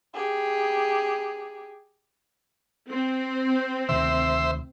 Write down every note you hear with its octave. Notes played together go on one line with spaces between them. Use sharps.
G4 G#4
C4
D2 C3 D#3 C5 E5